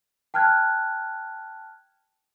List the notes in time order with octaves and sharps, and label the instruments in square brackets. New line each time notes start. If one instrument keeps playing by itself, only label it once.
[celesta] G5 A5 F6 F#6 G#6